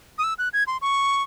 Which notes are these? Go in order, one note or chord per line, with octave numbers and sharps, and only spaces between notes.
D#6
E6
F#6
G#6
C6
C#6